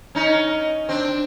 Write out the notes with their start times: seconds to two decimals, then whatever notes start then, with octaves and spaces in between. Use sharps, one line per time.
0.15 C#4 D#4
0.89 C4 D4